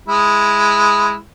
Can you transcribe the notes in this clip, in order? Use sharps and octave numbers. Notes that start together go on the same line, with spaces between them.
G#3 E4